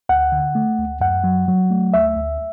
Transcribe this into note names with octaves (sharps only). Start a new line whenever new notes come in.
D2 F#5
D3
A3
D2
F#2 F#5
F#3
F#3
A3
D2 E5
D2